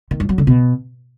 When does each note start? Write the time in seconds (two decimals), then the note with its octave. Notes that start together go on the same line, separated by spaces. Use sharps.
0.11 D#3
0.20 G2
0.29 F#3
0.38 D3
0.47 B2